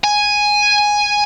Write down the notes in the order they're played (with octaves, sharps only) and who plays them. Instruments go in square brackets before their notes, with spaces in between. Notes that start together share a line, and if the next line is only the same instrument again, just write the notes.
[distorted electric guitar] G#5